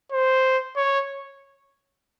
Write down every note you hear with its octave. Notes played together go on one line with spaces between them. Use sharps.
C5
C#5